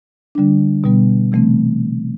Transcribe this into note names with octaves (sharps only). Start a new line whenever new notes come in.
D3 G3 D4
B2 G3 B3
C3 E3 A3 C4